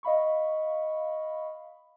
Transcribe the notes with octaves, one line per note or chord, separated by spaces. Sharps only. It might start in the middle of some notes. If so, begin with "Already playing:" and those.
D#5 F5 B5 C#6